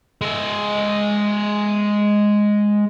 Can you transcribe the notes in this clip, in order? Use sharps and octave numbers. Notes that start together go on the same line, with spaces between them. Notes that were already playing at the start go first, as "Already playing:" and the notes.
G#3 E5